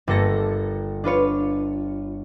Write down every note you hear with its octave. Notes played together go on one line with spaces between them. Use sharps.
G1 A#3 A4 A#6 C#7
D4 F4 B4 C#5